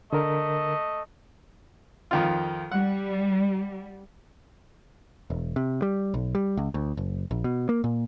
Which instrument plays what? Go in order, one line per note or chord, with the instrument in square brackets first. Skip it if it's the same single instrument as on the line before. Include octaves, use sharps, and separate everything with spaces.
[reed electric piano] D3 A#4 [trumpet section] A3 D#5
[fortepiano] F2 D#3 F4
[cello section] G3 [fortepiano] F#5
[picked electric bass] E1
C3
G3
B1
G3
C#2
D2
F#1
A#1
B2
A#3
A#2